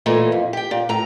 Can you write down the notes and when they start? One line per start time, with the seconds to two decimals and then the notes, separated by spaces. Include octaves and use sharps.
0.06 A#2 E3 A3 D#4
0.32 F2
0.53 G4 G5
0.71 A#2
0.89 A2 A#5